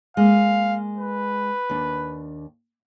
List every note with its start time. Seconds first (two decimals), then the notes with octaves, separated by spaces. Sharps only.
0.17 G#3 A#3 F5
0.98 B4
1.70 D#2 D4